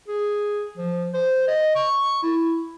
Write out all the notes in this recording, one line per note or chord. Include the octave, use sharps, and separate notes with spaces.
G#4
F3
C5
D#5
C#6
E4